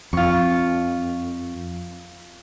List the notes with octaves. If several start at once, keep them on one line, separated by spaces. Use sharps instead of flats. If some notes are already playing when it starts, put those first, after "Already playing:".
F2 F4 C#6